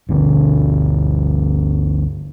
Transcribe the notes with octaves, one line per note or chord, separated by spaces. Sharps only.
G1 D2 D3